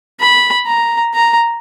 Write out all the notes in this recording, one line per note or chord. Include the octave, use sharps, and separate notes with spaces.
B5
A#5
A#5